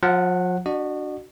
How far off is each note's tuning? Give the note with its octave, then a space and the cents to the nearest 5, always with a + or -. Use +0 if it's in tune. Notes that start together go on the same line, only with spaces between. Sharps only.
F3 +45 F#5 +0
D4 +0 F#4 +0 D#5 -45